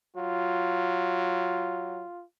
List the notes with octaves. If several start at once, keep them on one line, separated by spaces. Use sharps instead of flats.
F#3 F4